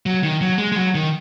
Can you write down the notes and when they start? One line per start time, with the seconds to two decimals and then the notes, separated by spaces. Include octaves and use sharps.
0.06 F#3
0.24 D#3
0.41 F#3
0.58 G#3
0.72 G#3
0.76 F#3
0.95 D#3